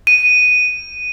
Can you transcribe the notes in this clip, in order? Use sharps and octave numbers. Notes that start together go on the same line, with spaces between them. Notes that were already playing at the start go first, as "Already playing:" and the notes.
D#7